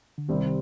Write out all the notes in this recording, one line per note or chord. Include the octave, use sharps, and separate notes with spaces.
D3
C2 C3 D#3 G3 C4